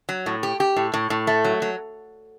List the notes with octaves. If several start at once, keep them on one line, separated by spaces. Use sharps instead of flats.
F#3
A2
G4
G4
A2
A2
A2
A3
F#3
F#3